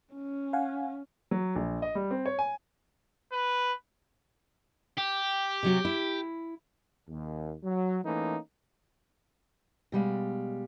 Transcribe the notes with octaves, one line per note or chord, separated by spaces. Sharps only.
C#4
F5 F#5 G#5
F#3
A#1
D#5
G3
C4
C#5
G#5
B4
G4
C3 F#3 F#4
E4
D#2
F#3
E3 A3 A#3 C#4 D#4
B2 G3 G#3 F5